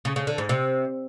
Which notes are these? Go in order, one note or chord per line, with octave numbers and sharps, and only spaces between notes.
C#3
C#3
D3
G#2
C3